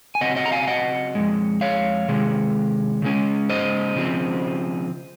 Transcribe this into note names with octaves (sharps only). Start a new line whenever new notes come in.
G#5
C#3 F#3 C4 D#5 F#5
D#5 F#5
A#5
F5 G#5
F5
D#5 F#5
F2 C#3 G#3
C#5 F5
C3 D#3 G#3
C#3 G#3 C#4
C5 D#5
C#3 F3 C4